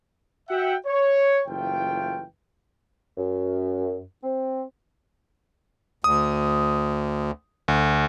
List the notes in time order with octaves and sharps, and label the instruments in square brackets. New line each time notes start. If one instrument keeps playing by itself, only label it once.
[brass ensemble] F#4 E5 F#5 G5
C#5
F#1 E3 A3 F4 G5
[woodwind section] F#2
C4
[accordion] D2 [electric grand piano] D#6
[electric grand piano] D2